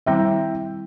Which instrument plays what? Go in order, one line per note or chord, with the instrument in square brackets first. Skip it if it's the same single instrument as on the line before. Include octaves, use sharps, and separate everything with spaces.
[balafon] D#3 G3 C4 E4 [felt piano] E5 G5